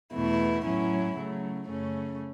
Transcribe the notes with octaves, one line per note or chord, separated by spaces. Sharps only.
E2 B2 A3 E4
A2 F#3 C#4 E4
C#3 F#3 A3
F#2 C#3 A3 C#4